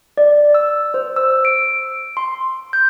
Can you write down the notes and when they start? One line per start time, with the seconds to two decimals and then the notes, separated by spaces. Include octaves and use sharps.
0.18 D5
0.54 E6
0.94 C5
1.16 E6
1.45 D7
2.17 C6
2.73 G6